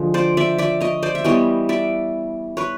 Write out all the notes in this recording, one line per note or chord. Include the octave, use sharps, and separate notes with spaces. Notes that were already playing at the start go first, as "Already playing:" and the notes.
Already playing: D3 F3 G#3
C5 D5
D5 E5
D5 E5
C#5 D#5
C5 D5
E5
E3 G3 B3 C#5 D#5
D5 E5
B4 C#5